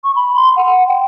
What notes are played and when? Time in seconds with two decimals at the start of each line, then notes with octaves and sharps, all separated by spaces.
0.04 C#6
0.16 B5
0.36 C6
0.56 F#5
0.88 G5